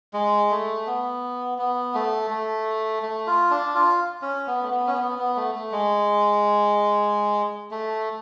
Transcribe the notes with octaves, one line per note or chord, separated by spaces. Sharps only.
G#3
A3
B3
B3
A3
A3
A3
F4
D4
F4
C#4
B3
A3
B3
C#4
B3
B3
A3
A3
G#3
A3